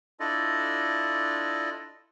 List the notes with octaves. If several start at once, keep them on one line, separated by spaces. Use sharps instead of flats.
D4 E4 F4 A4 D5 D#5